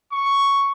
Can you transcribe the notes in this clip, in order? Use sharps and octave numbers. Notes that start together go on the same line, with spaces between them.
C#6